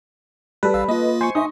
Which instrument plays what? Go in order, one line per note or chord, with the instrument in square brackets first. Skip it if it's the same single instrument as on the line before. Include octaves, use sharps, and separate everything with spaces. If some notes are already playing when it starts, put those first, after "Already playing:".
[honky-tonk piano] G3 [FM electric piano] A4 B4
[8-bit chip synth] A1 F5 E6
[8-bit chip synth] A#3 F4 [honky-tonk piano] D#5
[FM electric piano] C5 C#6 [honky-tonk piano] G#5
[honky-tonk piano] D#4 D#5 [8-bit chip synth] E5 G#5 D#6